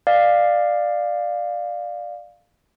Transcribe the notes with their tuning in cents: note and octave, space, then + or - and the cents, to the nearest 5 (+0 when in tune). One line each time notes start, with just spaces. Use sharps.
D5 +20 F5 +5